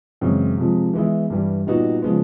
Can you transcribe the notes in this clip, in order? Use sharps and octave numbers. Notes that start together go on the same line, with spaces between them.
F#2 C#3 E3 G#3 C4
C3 F3 G#3
E3 G#3 B3 E4
G2 E3 G3
A#2 G3 B3 D#4 F#4
C#3 F3 G#3 B3